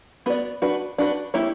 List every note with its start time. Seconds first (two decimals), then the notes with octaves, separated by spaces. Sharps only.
0.26 B3 F#4 B4 D5
0.62 D4 F#4 B4
0.98 D4 F#4 B4
1.34 A#3 E4 G4 C#5